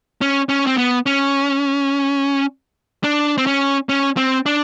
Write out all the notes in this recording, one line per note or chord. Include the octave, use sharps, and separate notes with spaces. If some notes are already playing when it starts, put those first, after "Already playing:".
C#4
C#4
C4
B3
C#4
D4
C4
C#4
C#4
C4
D4